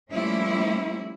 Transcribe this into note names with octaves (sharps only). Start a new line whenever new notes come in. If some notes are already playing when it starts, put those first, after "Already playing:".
F3 G3 A3 A#3 C#4 E4